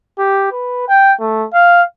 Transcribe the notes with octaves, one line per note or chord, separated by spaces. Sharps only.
G4
B4
G5
A3
F5